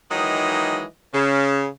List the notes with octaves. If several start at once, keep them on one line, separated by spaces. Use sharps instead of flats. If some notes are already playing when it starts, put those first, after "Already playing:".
D#3 E3 F#3 G#3 D#4 D#5
C#3